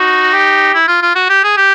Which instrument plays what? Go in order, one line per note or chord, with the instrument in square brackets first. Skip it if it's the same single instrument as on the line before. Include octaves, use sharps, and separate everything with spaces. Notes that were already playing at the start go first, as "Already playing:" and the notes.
Already playing: [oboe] D#4 [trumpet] F#4
[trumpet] G4
[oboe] E4
F4
F4
F#4
G4
G#4
G4